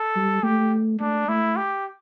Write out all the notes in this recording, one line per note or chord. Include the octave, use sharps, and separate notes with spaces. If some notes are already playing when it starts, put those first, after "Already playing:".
Already playing: A4
G3
A3 G4
A3 D4
A3 E4
G4